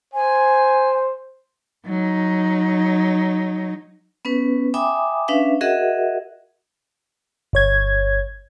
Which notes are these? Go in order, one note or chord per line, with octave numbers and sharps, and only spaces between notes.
C5 G#5
F#3 D#4
B3 C#4 B4
E5 G5 G#5 B5 D6 D#6
C#4 D4 B4 E5 F5
F#4 G#4 A#4 D#5 E5 F#5
G1 C#5 G#6